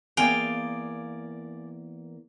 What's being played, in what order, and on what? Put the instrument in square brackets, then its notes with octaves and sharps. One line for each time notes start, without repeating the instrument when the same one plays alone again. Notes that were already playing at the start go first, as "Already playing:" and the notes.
[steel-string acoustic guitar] E2 A#3 A#4 [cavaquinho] G#4 D5 F5 [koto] G5